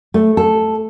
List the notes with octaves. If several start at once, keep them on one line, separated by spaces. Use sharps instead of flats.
A3
A4